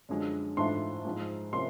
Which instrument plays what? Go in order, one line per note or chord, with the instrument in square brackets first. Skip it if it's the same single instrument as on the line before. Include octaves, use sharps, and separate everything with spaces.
[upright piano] F#2 D3 F3 G#3
[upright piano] G#2 E3 A3 D4 F4 [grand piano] C6
[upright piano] G#2 F3 G#3
[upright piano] C3 F3 A#3 C#4 E4 [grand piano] C6